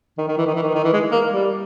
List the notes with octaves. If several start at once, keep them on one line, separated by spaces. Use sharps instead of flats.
D#3
D#3
E3
D#3
E3
D#3
D#3
E3
G#3
A#3
G3